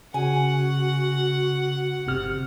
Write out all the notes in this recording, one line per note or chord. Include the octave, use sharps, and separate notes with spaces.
C#3 F#4 F#5 G#5
G1 C3 F6